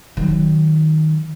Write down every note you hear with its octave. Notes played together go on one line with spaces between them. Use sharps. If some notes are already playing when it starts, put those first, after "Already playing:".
D#3 F#3